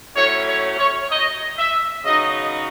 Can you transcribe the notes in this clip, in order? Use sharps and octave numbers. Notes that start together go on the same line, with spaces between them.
A2 F#3 C#4 C#5
C#5
C#5
D#5
E5
C#3 F#3 B3 D#4 D#5